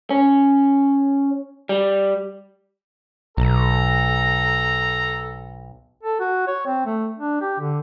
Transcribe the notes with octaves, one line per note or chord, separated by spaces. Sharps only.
C#4
G3
B1 A4 A#5
A4
F#4
C#5
C4
A3
D4
G4
D3